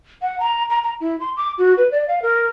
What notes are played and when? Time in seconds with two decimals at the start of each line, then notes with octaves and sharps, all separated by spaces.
0.22 F#5
0.40 A#5
0.70 A#5
0.83 A#5
1.00 E4
1.20 C6
1.37 D6
1.58 F#4
1.77 B4
1.91 D5
2.08 F5
2.22 A#4